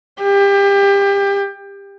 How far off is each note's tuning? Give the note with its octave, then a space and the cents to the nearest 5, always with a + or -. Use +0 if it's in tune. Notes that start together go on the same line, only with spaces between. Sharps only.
G4 +25